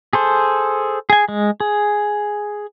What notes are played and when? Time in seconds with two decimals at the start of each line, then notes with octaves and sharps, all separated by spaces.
0.13 G#4 A4 C5
1.10 G#4 G#5
1.29 G#3
1.60 G#4